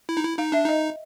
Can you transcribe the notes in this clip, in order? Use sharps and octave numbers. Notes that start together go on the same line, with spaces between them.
E4
D#4
E4
D#4 F5
D4 E5
D#4 D#5